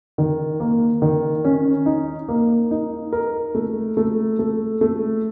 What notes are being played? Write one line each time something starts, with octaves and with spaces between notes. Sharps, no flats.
D#3
A#3
D#3
C#4
D#4
A#3
D#4
A#4
A3
A3
A3
A3